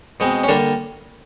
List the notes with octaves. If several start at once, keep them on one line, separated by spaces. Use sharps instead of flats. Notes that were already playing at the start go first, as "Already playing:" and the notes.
B2 G#3 C4
C#4
D3 G3 A#3 D4